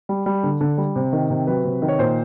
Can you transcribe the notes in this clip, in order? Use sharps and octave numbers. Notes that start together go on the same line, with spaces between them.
G3
G3
D3
D3
G3
C3
D#3
C3
F#3 B4
C3
D#3
C#5
A#2 C5